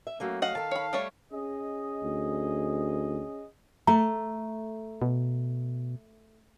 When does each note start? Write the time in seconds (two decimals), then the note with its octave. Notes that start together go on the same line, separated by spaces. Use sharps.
0.07 E5
0.20 F#3 A3 A#3 C#4
0.42 D#5 F5 F#5
0.55 D#3 A4 A5
0.71 C#5 B5
0.93 G3 A3 C#5
1.33 C#4 G#4 D#5
2.03 D2
3.87 A3 A#5
5.02 B2